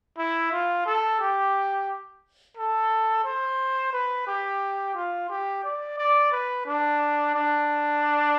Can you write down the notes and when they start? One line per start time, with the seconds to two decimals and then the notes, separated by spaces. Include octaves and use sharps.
0.18 E4
0.52 F4
0.86 A4
1.20 G4
2.57 A4
3.25 C5
3.93 B4
4.27 G4
4.95 F4
5.30 G4
5.64 D5
5.98 D5
6.32 B4
6.66 D4
7.35 D4